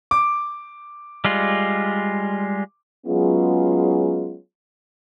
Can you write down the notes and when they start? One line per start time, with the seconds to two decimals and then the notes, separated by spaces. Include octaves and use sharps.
0.11 D6
1.25 G3 G#3 F4
3.06 F#3 G#3 B3 C#4 F4 G#4